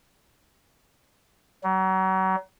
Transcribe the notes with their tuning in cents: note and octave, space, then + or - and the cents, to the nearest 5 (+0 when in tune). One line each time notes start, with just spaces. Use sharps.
F#3 +35